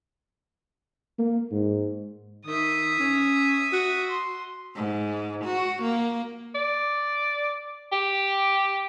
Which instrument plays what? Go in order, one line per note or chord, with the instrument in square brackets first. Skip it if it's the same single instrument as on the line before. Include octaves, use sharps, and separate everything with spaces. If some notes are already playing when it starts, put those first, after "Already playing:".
[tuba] A#3
G#2
[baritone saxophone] D#3 [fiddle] E5 D#6
[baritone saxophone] C#4
F#4
[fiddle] C6
[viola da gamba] G#2
F#4
A#3
[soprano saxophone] D5
G4